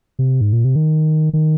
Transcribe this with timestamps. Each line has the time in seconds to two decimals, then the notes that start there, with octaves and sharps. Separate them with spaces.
0.19 C3
0.41 G#2
0.53 A#2
0.65 C3
0.76 D#3
1.33 D#3